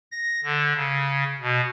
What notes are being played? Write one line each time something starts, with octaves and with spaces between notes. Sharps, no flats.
A#6
D3
C#3
B2